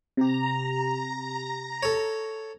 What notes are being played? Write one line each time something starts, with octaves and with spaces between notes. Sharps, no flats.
C3 G4 A#5
A4 C#5